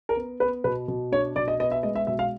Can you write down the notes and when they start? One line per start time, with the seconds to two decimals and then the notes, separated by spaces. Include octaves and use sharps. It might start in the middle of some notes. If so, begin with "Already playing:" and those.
0.09 A#4
0.16 B3
0.40 B3 B4
0.64 B2 B4
0.88 B2
1.12 D4 C#5
1.36 B2 D5
1.48 D#5
1.60 B3 D#5
1.71 E5
1.83 G#3 D#5
1.95 E5
2.07 B2 E5
2.19 F5